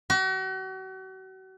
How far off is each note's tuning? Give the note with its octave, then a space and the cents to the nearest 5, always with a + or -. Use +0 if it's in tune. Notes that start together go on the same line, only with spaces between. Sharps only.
F#4 +40